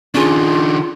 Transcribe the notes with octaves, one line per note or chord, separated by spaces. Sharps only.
D#3 C#4 D4 F4 G#4